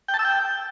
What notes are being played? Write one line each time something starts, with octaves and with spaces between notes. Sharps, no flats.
G5
A5
E6
G5